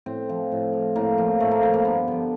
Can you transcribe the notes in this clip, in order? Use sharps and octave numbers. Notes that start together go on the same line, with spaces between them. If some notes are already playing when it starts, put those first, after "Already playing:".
A2 C4
F3
A2
F3
A2 A#3
F3
A2 A3
A#3
F3 A3
A#3
G2 B3
D3 F3